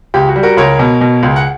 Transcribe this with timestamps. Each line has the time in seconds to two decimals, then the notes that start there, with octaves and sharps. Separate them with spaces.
0.14 C#2 G4
0.29 F#4
0.36 G3
0.43 F#4 A#4
0.57 C#2 A#4 C#5
0.79 B2
1.01 B2
1.23 C#2
1.36 F#5